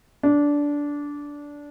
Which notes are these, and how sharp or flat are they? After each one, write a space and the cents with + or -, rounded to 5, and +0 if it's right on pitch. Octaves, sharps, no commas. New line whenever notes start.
D4 -15